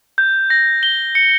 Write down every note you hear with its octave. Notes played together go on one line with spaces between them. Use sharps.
G6
A#6
G7
C#7